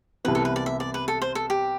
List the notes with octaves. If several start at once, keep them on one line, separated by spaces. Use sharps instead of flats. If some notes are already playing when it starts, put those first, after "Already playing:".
C2 C3 E3 B3 B4
A4
B4
D5
E5
D5
B4
A4
C5
A4
G4